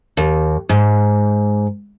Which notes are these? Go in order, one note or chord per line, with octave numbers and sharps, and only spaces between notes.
D#2
G#2